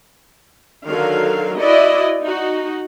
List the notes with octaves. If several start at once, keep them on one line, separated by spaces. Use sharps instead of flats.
D3 D#3 F#3 F5
E4 F#4 D5 D#5
D#4 F#4